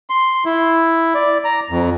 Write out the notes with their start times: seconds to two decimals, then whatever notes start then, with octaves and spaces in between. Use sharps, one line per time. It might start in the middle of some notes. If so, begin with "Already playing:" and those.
0.10 C6
0.45 E4
1.15 D5
1.45 A#5
1.70 F2